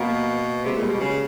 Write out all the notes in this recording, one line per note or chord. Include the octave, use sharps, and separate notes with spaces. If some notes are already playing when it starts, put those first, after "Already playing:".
Already playing: B2 A#3 B3
C3 G#3
A#2
G3
B2
C#3